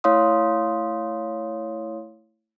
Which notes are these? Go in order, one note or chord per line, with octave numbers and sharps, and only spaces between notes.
A3 E4 C#5 F5 C6 D#6